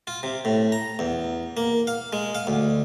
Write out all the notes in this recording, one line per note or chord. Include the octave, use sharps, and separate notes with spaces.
F4
C3
A2
A#5
E2
A#3
F5
G#3
F5
D2